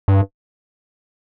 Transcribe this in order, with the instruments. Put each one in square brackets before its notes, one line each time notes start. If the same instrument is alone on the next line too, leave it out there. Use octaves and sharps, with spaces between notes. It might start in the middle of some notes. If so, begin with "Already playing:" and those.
[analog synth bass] G2